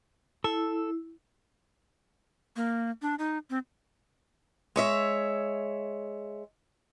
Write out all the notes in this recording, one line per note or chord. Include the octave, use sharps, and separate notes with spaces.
E4 A4
A#3
D4
D#4
C4
G#3 C#5 E5